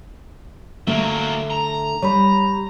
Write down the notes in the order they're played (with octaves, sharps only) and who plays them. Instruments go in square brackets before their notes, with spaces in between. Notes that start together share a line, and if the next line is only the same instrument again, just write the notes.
[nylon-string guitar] D3 A3 E5 [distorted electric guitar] F#3 A#3
[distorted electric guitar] A#5
[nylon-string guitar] G3 [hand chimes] C#5 B5